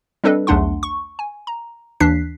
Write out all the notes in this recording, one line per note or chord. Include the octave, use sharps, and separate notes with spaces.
G3 C4 D4 A4 B4 D#5
B1 E2 A3 D4 F#5 C6
C#6
G#5
A#5
D#2 E3 D4 F#6 B6 C7